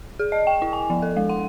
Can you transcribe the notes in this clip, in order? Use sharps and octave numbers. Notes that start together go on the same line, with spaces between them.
G#4
D#5
G5
E4
G#5
F3
A4
G#3
F#5